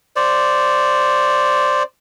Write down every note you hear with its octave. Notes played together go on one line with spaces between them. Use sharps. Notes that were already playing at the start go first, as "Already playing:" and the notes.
C5 D5